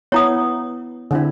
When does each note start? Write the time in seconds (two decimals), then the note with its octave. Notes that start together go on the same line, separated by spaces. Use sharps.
0.12 B3 E4 C#5 A#5 D#6
1.11 D3 C4 E4